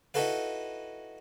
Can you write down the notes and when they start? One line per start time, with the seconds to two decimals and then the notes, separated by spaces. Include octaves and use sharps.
0.14 D#4 E4 F#4 A4 B4 F5